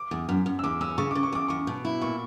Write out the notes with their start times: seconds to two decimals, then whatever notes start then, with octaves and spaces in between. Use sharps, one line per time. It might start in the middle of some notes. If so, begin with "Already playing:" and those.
Already playing: D6
0.11 E2
0.29 F#2
0.46 F#2
0.59 E6
0.64 E2 D6
0.81 C#4 E6
0.98 C#3 C#6
1.11 C#3 D6
1.23 C#6
1.32 E2 D6
1.48 E2 C#6
1.67 B2
1.85 E4
2.01 A#2 C#6